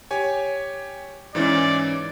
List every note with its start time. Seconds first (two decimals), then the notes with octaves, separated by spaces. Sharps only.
0.11 G4 C#5 G#5
1.35 G#2 E3 C#4 D5